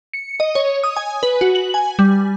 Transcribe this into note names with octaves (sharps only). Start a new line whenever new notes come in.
C#7
D#5
C#5
D#6
G#5
B4
F#4
F#7
G#5
G3